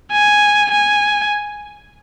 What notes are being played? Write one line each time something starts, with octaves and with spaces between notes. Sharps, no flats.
G#5
G#5